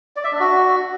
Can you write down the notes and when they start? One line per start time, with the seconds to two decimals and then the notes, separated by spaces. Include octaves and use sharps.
0.16 D5
0.24 E5
0.32 D4
0.40 F#4